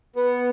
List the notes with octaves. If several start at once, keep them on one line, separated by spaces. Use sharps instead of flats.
B3